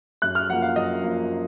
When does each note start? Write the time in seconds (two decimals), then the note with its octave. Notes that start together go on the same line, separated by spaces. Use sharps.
0.22 F#2 F#6
0.35 F6
0.49 F3 A#3 F4 F#5
0.62 F5
0.76 F#2 D#5
1.03 F3 A#3 F4